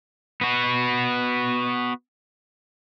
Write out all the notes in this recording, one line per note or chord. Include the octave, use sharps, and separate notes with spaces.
B3 F#4